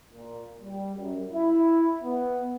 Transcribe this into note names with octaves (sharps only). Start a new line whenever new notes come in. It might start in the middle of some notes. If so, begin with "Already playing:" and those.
A#2
G3
F#2
E4
B3